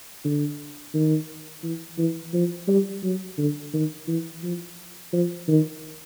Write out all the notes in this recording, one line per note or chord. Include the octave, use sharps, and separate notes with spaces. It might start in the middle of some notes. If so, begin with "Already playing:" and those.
D3
D#3
E3
E3
F3
G3
F#3
D3
D#3
E3
F3
F3
D#3